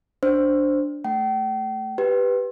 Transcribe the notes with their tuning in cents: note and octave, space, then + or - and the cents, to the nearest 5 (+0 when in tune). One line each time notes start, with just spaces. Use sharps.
D4 +0 C5 +0
A3 +0 G5 -40
G4 +0 B4 +0